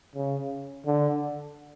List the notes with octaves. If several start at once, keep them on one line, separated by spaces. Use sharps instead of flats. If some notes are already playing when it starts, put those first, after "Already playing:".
C#3
D3